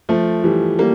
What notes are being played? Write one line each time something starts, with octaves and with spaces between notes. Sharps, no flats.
F3 A3
E3 G3
G3 A#3